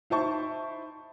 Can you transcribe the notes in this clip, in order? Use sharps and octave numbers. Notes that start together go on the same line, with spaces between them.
D#4 E4 C5 A5 C#6